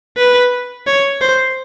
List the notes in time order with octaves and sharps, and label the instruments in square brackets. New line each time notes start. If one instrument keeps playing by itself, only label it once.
[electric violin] B4
C#5
C5